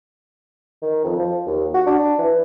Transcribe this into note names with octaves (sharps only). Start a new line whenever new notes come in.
D#3
F2
F3
D#2
F#4
D4
E3